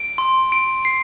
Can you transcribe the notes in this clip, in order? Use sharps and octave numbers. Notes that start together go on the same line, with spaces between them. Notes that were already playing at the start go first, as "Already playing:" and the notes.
Already playing: D7
C6
D7
C7